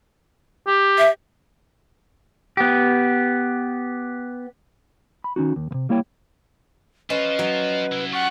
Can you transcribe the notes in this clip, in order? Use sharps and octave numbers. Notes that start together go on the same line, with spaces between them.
G4
E5
B3 G4
B5
D#3 C#4 D#4 F#4
D#2
D#2 C3
G3 A#3 E4 C#5 G5
C#4 F4 B4 C5 D#5
F#3
C2 E4
F4 G4 F#5 C#6